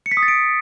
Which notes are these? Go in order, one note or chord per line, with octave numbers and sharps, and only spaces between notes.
C#7
B6
D#6
A6
D7